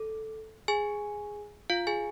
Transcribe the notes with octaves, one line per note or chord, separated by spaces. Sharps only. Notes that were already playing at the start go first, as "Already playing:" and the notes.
Already playing: A4
G#4 G#5
F4 F5
G#4 G#5